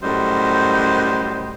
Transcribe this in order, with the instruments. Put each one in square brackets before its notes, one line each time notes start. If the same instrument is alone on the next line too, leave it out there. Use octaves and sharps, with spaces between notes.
[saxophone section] F#2 A2 G3 C5 D#5